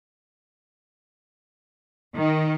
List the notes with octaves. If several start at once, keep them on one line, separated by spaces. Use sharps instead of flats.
D#3